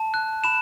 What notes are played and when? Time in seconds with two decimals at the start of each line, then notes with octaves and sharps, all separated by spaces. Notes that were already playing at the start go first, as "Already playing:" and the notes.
Already playing: A5
0.14 F#6
0.44 B5 E7